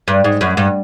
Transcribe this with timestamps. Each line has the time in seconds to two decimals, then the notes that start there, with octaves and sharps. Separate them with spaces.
0.08 G2
0.24 G#2
0.41 F#2
0.57 G2